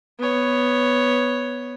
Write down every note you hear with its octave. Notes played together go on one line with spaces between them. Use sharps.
B3 C#5